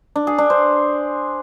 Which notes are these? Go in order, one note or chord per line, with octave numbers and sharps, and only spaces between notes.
D4
G#4
D4
C5